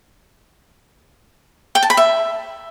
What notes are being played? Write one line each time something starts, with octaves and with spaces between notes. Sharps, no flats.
G5
A5
B5
E5